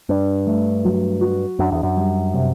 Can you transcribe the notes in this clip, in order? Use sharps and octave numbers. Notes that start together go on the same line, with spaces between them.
G2 D4
A3
F#3
F#4
F#2 D4
E2
F#2
G3
C3